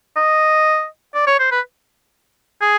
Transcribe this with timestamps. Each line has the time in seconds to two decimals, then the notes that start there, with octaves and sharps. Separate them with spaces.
0.17 D#5
1.15 D5
1.27 C#5
1.39 C5
1.52 B4
2.61 G#4